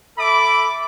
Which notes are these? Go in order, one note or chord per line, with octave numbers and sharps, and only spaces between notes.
A4 E5 B5 D6